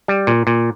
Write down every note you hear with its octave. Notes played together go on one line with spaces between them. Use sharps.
G3
A#2
A#2